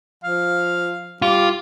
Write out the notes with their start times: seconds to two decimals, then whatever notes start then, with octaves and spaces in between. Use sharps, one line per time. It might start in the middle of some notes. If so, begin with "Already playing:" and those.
0.24 F3 F5
1.22 G3 F4 D6